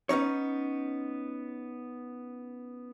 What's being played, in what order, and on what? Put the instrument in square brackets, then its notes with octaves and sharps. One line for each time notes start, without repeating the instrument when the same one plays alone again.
[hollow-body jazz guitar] B3 C#4 D#4 C#5